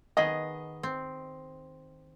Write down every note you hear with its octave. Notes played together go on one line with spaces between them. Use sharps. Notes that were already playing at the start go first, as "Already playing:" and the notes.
D#3 B3 G#4 D#5
C4